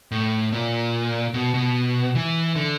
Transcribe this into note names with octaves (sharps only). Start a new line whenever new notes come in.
A2
A#2
B2
B2
E3
D3